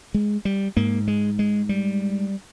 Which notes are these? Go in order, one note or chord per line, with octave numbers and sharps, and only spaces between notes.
G#3
G3
G#2 A#3
G#3
G#3
G3